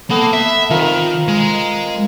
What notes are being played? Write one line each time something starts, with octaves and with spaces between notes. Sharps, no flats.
A#3 B3 A4
E5
D#3 C4 F4 A#4
G#3